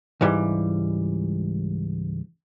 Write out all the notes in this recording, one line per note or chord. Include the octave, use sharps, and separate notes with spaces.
C#2 G#2 E3 G3